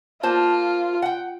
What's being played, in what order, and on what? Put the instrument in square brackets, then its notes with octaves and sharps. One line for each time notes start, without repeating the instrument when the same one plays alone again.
[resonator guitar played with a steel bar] A#3 C5 A5 [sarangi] F4
[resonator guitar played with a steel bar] F#5 G5